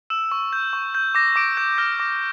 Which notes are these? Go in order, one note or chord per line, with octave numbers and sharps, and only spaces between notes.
E6 E7
C#6
G6
C#6
G6
D6 A#6
D6 D7
G6 D7
F6 A#6
D6 A#6